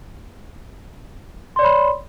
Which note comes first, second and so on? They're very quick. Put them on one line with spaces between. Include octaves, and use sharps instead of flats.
C6 D5 C#5 B5